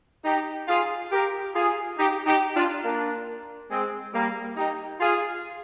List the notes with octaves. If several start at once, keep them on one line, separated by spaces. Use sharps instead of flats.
D#4 G4
F4 G#4
G4 A#4
F4 G#4
D#4 G4
D#4 G4
D4 F4
A#3 D4
G#3 C4
G3 A#3
D#4 G4
F4 G#4